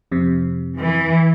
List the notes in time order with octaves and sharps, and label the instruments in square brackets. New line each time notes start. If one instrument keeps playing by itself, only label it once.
[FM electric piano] F2 C3
[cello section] E3